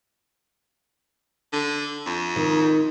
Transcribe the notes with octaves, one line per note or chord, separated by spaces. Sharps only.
D3
F2
D#3